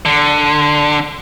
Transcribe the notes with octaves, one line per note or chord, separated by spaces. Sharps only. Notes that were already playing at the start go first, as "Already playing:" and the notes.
D3